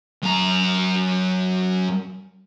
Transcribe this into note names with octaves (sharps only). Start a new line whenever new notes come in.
F#2 A#5